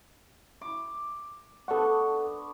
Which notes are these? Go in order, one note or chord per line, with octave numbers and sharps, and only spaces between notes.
D6
B3 D4 A4 F#5 C#6